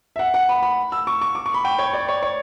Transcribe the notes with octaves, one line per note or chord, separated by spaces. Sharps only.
E5
F#5
F#5
B5
B5
E6
C#6
C#6
D6
C#6
B5
G5
C#5
D5
C#5
C#5